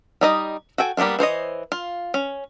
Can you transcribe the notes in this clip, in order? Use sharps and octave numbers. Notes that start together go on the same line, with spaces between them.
G3 D#4 D#5
F#4 A4 G5 G#5
G3 A#3 B3 D4 F4
E3 C5 C#5 D#5
F4
C#4